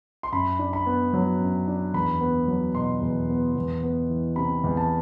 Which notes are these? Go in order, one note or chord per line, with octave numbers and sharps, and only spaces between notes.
C6
F#2 B5
D4
B5
B3
F#3
F#2
D4
E2 B5
B3
F#3
B2 C6
E2
B3
E2
B3
E3
C3 B5
E2
A5